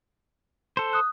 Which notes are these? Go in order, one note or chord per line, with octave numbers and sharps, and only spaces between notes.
A4 C5
D#6 F#6